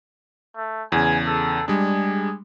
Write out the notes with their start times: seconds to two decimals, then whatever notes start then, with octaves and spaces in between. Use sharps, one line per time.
0.56 A3
0.92 E2 C#3 G#5
1.26 A4
1.68 G3 G#3 D4 G#4